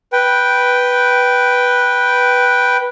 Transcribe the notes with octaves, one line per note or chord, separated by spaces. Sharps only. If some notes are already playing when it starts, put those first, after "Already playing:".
B4 G5